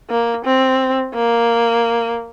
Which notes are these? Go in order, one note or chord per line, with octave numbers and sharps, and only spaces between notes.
A#3
C4
A#3